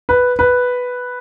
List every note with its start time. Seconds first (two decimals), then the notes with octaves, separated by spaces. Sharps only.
0.09 B4
0.39 B4